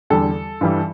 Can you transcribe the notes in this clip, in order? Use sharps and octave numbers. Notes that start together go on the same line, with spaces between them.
E2 D3 G3 A4
G2 E3 G3